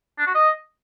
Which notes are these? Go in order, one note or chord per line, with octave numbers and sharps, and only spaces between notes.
D4
F#4
D#5